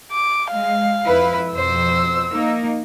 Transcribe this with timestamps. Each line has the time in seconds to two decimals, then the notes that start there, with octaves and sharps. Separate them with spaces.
0.11 D6
0.51 G#3 F5
1.05 F2 E4 B4
1.53 F2 B2 C5 E6
2.31 A#3 D#4